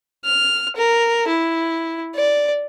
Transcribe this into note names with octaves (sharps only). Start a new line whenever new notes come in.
F6
A#4
E4
D5